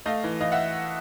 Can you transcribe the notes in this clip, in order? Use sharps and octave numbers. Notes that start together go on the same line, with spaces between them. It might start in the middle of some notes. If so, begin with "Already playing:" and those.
A3 D#5 F5
E3
E3 D#5 F5
E5 F#5